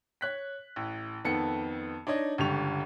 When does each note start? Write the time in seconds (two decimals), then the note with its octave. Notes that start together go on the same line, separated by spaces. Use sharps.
0.21 C#5 F#6 B6
0.76 A1
1.25 F2 D#3 B3 A4 C#7
2.07 D4 D#4 C#5 D#5
2.38 G1 C#2 D3 G4 C#6 F7